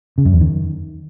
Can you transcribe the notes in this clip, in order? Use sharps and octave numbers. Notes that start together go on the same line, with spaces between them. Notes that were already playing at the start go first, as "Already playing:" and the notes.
C#3
F#2
E2
D#3